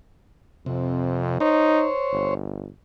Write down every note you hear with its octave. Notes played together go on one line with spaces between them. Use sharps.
F2 C3
D#4 C5 C#5
G1